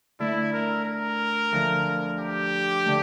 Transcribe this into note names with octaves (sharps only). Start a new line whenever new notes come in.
D3 A3 D4 E4
A#4
A#4
D2 D3 F3
G4
D3 A3